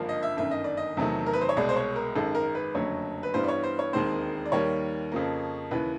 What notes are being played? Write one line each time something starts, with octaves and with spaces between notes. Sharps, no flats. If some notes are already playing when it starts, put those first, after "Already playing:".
Already playing: G#1 G2 D3 F3 A#3
D#5
E5
G1 F#2 D#3 E5
D#5
D5
D#5
E2 C3 D#3 F#3 A3
A#4
B4
C5
C#5
C2 B2 G#3 D5
C5
C#5
A#4
G#1 F#2 D#3 G#3 A4
A#4
B4
F#1 F2 D3 F#3 A3 C#5
B4
G2 E3 G3 B3 C5
D5
C#5
C5
C#5
E1 D#2 D#3 G#3 C4 C5
D5
D#2 D#3 G3 A#3 C#5
F2 C#3 F3 A#3
D#2 C#3 E3 B4